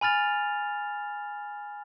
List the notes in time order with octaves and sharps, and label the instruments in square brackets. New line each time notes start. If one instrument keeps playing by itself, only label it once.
[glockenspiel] G#5 B5 F6 A6 F7